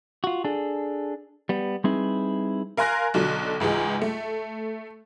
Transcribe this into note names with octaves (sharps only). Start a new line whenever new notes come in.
F4 F#4
D4 G#4 A4
G3 B3
G3 C4 D#4 E4 G#4 B4
A#4 F5 G#5 C6 F#6 A#6
B1 D3 F#3
C#2 G#2 E3 G#4
A3